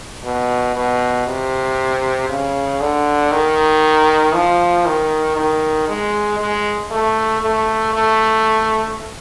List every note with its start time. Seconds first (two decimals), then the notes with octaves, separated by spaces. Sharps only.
0.24 B2
0.76 B2
1.27 C3
2.30 C#3
2.81 D3
3.32 D#3
4.34 F3
4.86 D#3
5.36 D#3
5.88 G#3
6.39 G#3
6.91 A3
7.42 A3
7.93 A3